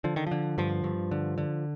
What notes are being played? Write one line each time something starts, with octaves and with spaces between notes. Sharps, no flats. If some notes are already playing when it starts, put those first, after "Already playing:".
D3 F3
D#3
D3 F3
G2 F3
G2
D3
D3